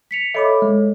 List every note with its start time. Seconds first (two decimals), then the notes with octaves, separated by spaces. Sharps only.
0.11 B6 C#7 F7
0.35 A4 C#5 D#5 E5 B5 D6
0.62 G#3